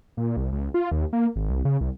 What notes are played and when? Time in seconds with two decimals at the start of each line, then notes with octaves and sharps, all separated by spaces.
0.17 A#2
0.37 C2
0.52 C#2
0.74 F4
0.92 D#2
1.13 A#3
1.36 G#1
1.50 C2
1.65 C#3
1.81 C2